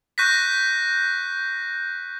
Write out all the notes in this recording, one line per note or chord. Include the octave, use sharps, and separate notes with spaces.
C#6 F#6 G6 A#6 B6